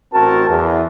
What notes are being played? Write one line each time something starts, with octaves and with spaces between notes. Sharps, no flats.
A1 C4 F#4 A#4 A5
E2